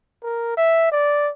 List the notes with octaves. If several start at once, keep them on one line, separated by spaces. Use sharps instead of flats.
A#4
E5
D5